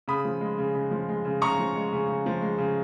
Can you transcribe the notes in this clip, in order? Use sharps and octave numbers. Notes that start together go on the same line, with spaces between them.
C#3 B5 D#6
F3
G#3
C#3
C#3
F3
G#3
C#3
C#3 A#5 C#6
F3
G#3
C#3
C#3
F3
G#3
C#3